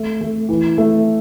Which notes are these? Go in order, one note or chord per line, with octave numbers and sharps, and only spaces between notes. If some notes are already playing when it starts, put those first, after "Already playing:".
Already playing: A3
A3
E3
A3